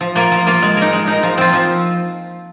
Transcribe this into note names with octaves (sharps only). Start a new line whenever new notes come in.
F3
A#3 F4 A#4
F3
A#3 F4 A#4
G#3
D#4 A#4
G#3
D#4 A#4
F3
C4 F4
F3